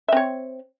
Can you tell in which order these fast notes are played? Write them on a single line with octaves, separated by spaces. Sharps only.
E5 C4 C#5